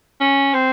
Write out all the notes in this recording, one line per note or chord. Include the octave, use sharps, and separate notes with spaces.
C#4
C4